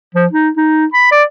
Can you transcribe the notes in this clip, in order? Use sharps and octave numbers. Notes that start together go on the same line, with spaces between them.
F3
D#4
D#4
B5
D5